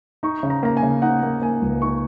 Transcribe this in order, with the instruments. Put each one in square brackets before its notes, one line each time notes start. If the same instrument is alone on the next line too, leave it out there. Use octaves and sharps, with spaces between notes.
[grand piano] D#4 C#6
C#3
A#5
A#3 A#5
G#5
C#3
D#4 F#5
A#3
A#3 G#5
C#2
D#4 C#6